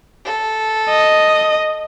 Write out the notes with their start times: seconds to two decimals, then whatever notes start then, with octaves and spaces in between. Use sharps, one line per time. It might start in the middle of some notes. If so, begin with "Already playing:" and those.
0.25 A4
0.90 D#5